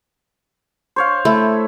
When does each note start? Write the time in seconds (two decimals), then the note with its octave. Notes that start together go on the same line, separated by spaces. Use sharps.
0.96 C5 C#5 F5
1.25 A3 E4